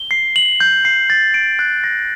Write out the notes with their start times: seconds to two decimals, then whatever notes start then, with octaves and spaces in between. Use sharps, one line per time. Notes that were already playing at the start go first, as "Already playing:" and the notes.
Already playing: G7
0.11 C7
0.36 F#7
0.60 G6
0.85 C7
1.10 A6
1.34 D7
1.59 F#6
1.84 A#6